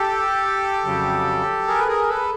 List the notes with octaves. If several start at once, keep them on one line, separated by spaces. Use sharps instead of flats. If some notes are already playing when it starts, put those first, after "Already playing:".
Already playing: G4 A4
F2 C#3 F#3
G#4 A#4
B4
G#4 A#4
A4 B4